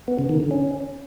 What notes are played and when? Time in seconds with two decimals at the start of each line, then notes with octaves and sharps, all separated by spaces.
0.08 B3
0.19 C#3
0.29 D#3
0.40 D3
0.51 C#4